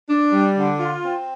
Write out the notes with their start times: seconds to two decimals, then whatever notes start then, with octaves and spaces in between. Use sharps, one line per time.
0.09 D4
0.33 G3
0.57 D3
0.80 F4
1.03 C4